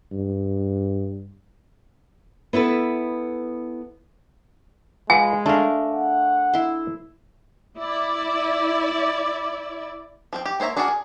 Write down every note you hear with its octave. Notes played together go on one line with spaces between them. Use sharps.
G2
B3 E4 A4 B4
G#3 F4 B4 G#5
A3 D4 A#4 F5
F#5
E4 C6
E4 D5
F3 C4 G5
G4
A#3 C5 C#5 E5 A#5
D4 F#4 G#4 A#4 D5
G#4